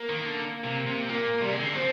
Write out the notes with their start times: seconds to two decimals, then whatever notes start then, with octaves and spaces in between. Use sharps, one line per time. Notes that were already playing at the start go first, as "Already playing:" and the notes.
Already playing: A#3
0.09 D#3
0.26 D3
0.64 C3
0.87 C3
1.09 A#2 A#3
1.41 C3 G3
1.52 G#3
1.59 D3 A#3
1.75 F3 C4